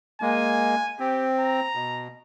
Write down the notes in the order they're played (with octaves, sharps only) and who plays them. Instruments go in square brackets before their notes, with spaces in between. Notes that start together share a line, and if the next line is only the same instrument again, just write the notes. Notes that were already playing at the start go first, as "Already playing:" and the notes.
[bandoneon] G#3 A#3 [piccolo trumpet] G#5
[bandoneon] C4 [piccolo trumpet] G4
[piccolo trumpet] A#5
[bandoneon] B2